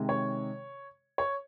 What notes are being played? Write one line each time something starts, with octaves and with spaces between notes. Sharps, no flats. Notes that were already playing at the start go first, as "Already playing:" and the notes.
Already playing: C3 D#3 G#3
C#5
C#5